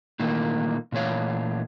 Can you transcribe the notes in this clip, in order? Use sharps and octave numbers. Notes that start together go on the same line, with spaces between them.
A#2 D#3 E3 A3 A#3
A#2 E3 A3 C#5 F5